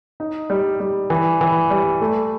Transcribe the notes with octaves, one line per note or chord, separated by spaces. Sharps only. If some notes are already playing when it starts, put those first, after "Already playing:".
D#4
G3
G3
E3
E3
G3
A3